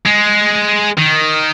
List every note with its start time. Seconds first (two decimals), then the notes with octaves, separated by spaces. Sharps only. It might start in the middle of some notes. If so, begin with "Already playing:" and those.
0.05 G#3
0.98 D#3